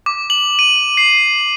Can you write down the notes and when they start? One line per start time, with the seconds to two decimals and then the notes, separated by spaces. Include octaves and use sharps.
0.06 D6
0.30 F#7
0.59 D#7
0.97 C7